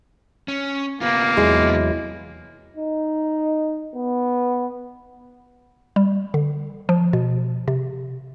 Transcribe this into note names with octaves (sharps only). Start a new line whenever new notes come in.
C#4
C3 A#3 B3 F4
E2 F#3 G#3 E4
D#4
B3
G3
D3
F3
B2
C3